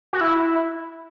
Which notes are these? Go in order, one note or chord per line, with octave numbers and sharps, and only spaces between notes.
F#4
E4